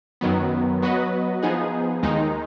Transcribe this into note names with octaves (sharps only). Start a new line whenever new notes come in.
F#2 D#3 F#3 B3
F#3 B3 F#4 B4 D#5
F3 B3 D#4 G#4
D#2 D#3 G#3 D#4